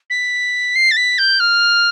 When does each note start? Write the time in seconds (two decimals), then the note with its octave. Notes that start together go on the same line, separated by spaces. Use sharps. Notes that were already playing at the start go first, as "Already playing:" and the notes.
0.10 B6
0.75 C7
0.91 A6
0.97 B6
1.18 G6
1.40 F6